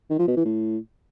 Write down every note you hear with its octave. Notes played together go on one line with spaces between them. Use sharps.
D#3
F3
B2
E3
A2